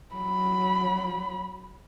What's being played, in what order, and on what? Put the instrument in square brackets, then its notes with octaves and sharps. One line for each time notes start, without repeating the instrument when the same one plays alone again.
[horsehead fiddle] F#3 B5